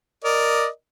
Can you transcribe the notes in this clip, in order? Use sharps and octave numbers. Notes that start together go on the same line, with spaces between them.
A#4 D5 D#5